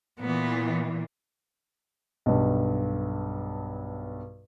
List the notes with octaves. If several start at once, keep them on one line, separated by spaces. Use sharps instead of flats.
A#2 E3 B3
B1 G2